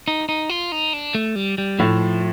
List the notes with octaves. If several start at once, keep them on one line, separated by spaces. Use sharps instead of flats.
D#4
D#4
F4
D#4
D4
A3
G3
G3
A2 F3